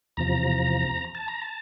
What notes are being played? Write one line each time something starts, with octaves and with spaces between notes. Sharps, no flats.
E2 C3 F3 A#5
A5
A#5
A5